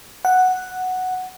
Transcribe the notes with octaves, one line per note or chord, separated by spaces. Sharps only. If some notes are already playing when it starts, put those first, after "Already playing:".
F#5